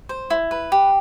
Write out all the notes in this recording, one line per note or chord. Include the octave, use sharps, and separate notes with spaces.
C5
E4
B4
G4